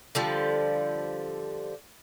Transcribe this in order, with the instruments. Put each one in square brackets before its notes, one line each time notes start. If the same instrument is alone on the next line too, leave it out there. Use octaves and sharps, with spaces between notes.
[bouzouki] D3 F3 G3